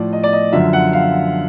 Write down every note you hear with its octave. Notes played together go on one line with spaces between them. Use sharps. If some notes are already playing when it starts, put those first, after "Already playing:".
Already playing: A2 F3 D5
D#5
D5
D#5
F#2 D3 F3 E5
F#5
F5